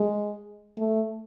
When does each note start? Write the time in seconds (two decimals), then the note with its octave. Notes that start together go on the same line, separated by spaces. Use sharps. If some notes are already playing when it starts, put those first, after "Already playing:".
Already playing: G#3
0.78 A3